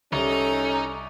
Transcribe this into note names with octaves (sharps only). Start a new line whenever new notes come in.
C2 C#4 D#4 A4